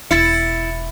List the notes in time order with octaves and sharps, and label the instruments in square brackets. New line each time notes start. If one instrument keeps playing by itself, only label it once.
[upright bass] E1 [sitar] E4 [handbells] A6 C#7